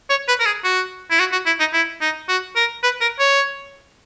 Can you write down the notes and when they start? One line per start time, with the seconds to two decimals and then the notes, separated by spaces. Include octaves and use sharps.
0.10 C#5
0.28 B4
0.40 A#4
0.46 G#4
0.64 F#4
1.11 E4
1.19 F#4
1.32 F#4
1.46 E4
1.60 D#4
1.73 E4
2.01 D#4
2.28 F#4
2.56 A#4
2.83 B4
3.01 A#4
3.19 C#5